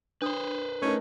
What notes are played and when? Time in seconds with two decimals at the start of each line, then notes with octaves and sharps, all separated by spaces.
0.22 D4 B4 C5 D#6
0.82 A3 C#4 D#4 A#4